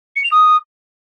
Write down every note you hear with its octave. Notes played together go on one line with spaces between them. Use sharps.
C#7
F7
D#6